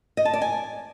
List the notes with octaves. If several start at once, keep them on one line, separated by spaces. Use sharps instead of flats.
D#5
A5
D5
G#5